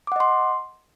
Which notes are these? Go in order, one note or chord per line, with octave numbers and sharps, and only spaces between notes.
D#5 F#5 C6 D6